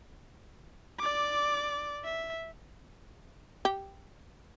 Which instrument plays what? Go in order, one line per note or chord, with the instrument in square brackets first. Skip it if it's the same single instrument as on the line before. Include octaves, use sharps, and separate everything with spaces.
[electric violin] D5 D6
E5
[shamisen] G4